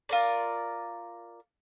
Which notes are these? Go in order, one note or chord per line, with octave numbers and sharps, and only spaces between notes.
F4 A#4 D5